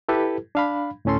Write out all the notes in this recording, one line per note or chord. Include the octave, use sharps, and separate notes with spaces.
E4 G4 A4 B4
D4 F5 B5
D2 A2 C#4 A4 C6